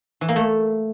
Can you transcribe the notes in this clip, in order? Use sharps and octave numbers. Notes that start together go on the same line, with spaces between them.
E3
A#3
A3